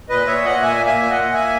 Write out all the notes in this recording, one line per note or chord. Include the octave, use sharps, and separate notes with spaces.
A#2 B4 D#5
A#2 C#5 E5
A#3 D#5 F#5
A#2 E5 G#5
A#3
E5 G#5
A#2
D#5 F#5
A#3
A#3 E5 G#5